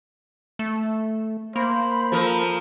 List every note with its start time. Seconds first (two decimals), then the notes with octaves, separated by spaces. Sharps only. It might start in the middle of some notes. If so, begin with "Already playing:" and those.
0.59 A3
1.56 A#3 C5 B5
2.12 F3 A4 A#4